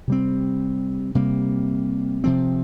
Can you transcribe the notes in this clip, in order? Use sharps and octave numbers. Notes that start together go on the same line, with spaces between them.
C3 G3 C4
C3 G3 A#3
C3 F3 C4